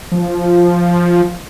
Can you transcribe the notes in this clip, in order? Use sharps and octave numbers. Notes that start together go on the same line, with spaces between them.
F3